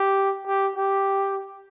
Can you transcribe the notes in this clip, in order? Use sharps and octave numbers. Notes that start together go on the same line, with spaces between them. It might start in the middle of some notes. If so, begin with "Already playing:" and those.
Already playing: G4
G4
G4